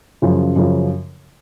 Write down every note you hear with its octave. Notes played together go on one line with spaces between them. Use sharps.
F#2 C#3 F3
F#2 C#3 F3